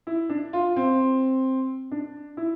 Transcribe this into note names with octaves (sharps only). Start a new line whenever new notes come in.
E4
D4
F4
C4
D4
E4